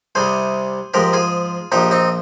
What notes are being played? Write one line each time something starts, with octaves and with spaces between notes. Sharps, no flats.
C2 C3 G3 G#4 C5
G#2 F3 G#3 G4 A#4
F4 G#4
A#1 A#2 F3 D#4 G4
C4 D#4